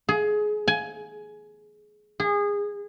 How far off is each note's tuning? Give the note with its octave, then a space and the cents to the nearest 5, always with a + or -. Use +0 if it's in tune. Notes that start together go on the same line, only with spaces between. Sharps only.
G#4 +20
G#5 +15
G#4 -25